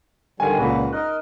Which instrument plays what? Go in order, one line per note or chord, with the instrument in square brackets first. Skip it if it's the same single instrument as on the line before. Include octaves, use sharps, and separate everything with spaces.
[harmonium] D3 D#3 G3 [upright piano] G#5 D#7
[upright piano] C#2 A#3 D5 [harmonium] A#2 F#4 B4
[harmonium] D#4 A#4 D#5 [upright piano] F#6